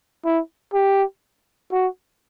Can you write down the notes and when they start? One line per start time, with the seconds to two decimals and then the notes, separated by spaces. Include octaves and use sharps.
0.25 E4
0.74 G4
1.72 F#4